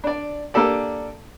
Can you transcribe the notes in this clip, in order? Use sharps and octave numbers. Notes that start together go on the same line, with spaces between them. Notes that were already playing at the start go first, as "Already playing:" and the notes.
D4 D5
A#3 D4 G4 A4 D5